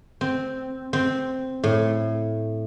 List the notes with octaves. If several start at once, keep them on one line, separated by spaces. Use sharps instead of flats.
C4
C4
A2